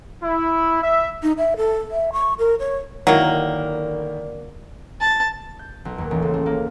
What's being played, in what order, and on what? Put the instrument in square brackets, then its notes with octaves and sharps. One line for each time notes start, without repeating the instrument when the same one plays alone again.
[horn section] E4
E5
[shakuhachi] D#4
E5
A4
E5
C#6
A#4
C#5
[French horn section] D3 A#4 D5 [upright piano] D#3 E4 [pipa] F#3 A#3
[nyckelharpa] A5
[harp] G6
B1
D#2
A1
C#2
A3
A#3